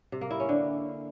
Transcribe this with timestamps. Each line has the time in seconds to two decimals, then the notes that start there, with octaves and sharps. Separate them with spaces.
0.12 C3
0.21 A#3
0.31 E4
0.40 C#4
0.49 D3